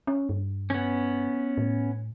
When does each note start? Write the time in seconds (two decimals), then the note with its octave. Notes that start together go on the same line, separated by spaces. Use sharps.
0.07 C#4
0.29 G2
0.70 B3 C#4
1.57 A2